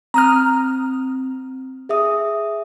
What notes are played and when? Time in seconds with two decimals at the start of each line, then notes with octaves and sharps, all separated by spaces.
0.14 C4 A#5 D#6 F6
1.89 G#4 E5 D#6